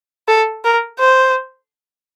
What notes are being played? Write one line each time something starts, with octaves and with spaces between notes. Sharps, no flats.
A4
A#4
C5